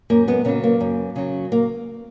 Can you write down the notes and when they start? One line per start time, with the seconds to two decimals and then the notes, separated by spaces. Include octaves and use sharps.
0.10 F#2 A#3
0.28 G#3 B3
0.45 C#3 F#3 A#3 C#4
0.64 A#3
0.81 F#2
1.16 C#3 F#3
1.52 A#3